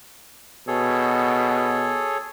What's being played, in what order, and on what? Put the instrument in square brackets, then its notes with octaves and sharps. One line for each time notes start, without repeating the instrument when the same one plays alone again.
[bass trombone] B2 [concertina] G#4 A4 C#5